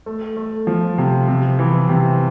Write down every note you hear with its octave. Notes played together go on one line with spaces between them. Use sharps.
A3
A3
F3
C3
C3
E3
C3